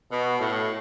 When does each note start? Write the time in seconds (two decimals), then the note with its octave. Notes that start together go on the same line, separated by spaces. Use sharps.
0.11 B2
0.39 A2